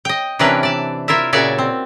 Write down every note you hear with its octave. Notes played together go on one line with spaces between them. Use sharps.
D#5 G5
C3 E3 C#4 D4 A#4 B4
D5 A5
E4 F4 A#4 E5
A#2 C#3 F#4 C#5 D5 E5
C4